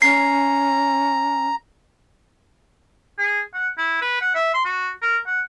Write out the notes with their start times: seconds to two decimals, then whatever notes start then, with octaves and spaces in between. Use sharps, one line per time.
0.02 C#4 A#5 C7
3.18 G#4
3.54 F#5
3.77 E4
4.01 B4
4.21 F#5
4.35 E5
4.54 C6
4.65 F#4
5.02 A#4
5.27 F#5